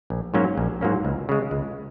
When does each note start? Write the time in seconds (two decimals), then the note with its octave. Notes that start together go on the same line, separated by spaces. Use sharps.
0.10 A#1
0.34 G#2 F#3 A#3 C#4
0.58 A#1
0.81 G#2 F#3 A#3 C#4
1.05 C#2
1.29 C#3 G#3
1.51 C#2